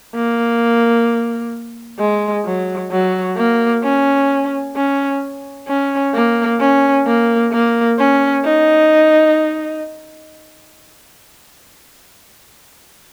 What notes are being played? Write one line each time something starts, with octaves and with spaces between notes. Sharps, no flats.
A#3
G#3
F#3
F#3
A#3
C#4
C#4
C#4
A#3
C#4
A#3
A#3
C#4
D#4